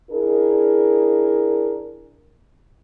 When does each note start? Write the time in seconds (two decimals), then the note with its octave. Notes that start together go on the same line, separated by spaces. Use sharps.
0.10 D4 E4 G#4 A#4